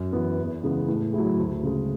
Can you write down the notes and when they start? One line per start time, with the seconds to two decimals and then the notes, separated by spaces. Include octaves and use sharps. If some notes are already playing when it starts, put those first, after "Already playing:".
Already playing: F#2
0.13 E3 B3
0.38 E2
0.63 C#3 E3 G#3 B3
0.88 A2
1.13 F#3 A3 E4 G#4
1.38 D2
1.63 C#3 G#3